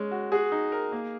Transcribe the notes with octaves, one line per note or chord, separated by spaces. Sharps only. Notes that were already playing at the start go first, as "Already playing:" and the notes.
Already playing: G#3 C#4
F#4
F#4 G#4
D#4
A#4
A#3